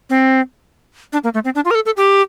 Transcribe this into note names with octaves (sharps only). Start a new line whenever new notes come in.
C4
D4
A#3
A3
C4
D4
F4
A#4
A4
A4
G4